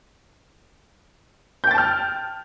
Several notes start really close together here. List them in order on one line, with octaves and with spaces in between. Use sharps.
G6 G5 A6 A5 F6